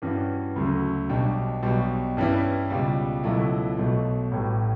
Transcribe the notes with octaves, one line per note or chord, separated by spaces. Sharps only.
G2 E3 G3 C#4 F#4
D2 C#3 F#3 A3
B1 B2 G3 D4
B1 B2 G3
G2 E3 G3 C#4 E4
C#2 B2 G3
C#2 B2 F#3 A3 E4
B1 B2 A3
A1 A2 G3